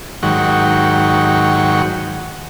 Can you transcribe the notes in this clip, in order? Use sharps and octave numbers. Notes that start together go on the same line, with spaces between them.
G#2 D#3 F#3 F#5 G5 C#6